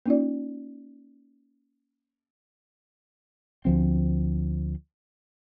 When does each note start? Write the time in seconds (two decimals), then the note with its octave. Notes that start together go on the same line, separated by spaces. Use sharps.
0.06 A#3 C#4 D#4 F4 D5
3.65 D2 F3 C4